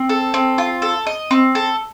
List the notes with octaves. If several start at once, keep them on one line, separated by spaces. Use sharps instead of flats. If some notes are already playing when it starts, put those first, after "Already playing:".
Already playing: C4
A4
C4
F4
A4
D#5
C4
A4